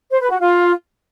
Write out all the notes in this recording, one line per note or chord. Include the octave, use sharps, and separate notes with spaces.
C5
B4
F#4
F4